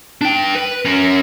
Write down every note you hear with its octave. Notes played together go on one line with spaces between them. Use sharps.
D4 G5
B4
C#4 A#4